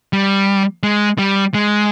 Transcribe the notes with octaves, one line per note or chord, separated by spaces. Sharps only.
G3
G#3
G3
G#3